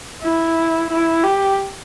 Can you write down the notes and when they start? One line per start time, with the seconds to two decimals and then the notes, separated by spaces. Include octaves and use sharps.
0.21 E4
0.89 E4
1.23 G4